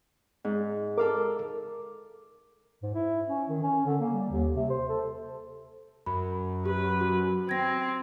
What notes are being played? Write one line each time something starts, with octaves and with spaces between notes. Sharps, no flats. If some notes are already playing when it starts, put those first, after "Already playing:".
G#2
A4 A#4 F5 D6
G#2
E4
C#4
D#3
C#4
D3
A#3
G3
D#2
C3
C5
A4
F#2 B5
G4 B4
F#4
C4 G#6 A#6